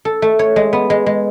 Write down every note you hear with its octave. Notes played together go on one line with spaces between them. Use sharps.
A4
A3
C#5
G#3
B3
G#3
G#3